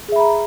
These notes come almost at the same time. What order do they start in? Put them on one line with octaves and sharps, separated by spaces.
G#4 E5 B5 A#5